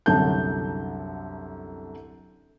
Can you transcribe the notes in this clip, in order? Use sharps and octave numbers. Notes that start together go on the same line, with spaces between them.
C2 F#2 D3 A5 G6